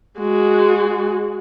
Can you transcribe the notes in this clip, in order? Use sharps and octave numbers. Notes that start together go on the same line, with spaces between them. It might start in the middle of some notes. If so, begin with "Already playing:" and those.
G#3 F#4